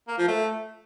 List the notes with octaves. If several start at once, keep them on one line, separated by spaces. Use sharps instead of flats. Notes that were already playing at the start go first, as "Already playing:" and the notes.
A#3
F3
A3